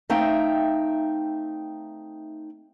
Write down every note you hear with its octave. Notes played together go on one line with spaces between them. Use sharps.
A3 C4 D#4 E5 F5 G5